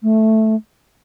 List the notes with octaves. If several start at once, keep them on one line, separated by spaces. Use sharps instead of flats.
A3